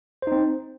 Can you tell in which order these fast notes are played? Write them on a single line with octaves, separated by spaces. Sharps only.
C5 D#4 C4